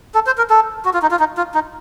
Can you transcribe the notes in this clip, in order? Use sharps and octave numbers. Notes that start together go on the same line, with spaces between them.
A4
C5
A#4
A4
F#4
F4
D#4
F4
D#4
F4
D#4